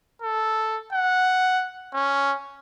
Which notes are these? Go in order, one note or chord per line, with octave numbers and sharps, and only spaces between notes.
A4
F#5
C#4